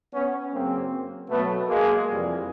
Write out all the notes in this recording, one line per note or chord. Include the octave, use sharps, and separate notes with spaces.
B3 C#4
F#2 C#3 F#3 A#3 C4
B2 F#3 A3 B3
G#3 A#3
F2 C3 E3 G3